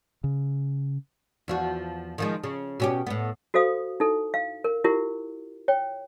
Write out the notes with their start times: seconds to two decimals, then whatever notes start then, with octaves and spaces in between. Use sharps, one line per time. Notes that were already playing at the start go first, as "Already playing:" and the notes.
0.24 C#3
1.48 E2 F3 F#4
2.18 D#3 F3 G#3
2.44 C#3
2.80 B2 C#4 G4
3.07 A2 B3
3.54 F#4 A4 C5 F5 D#6
4.00 D#4 E4 A4
4.34 F5
4.64 A#4
4.84 E4 F4 G4 A#4
5.68 C#5 G5